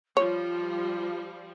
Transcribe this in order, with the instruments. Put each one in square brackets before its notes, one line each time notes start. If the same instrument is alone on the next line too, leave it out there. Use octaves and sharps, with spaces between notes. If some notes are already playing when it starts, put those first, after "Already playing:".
[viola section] F3 G3 [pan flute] F4 [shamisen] C#5